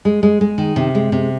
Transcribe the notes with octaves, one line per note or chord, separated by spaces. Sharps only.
G#3
G#3
G#3
D#3
C3
G#3
C3